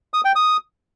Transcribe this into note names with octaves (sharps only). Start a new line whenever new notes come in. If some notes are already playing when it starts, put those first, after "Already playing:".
D#6
G5
D#6